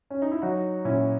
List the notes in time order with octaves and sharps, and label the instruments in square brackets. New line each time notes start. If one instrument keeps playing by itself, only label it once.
[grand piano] C#4
D#4
E4
F#3 D#4 F#4
A#2 C#4 E4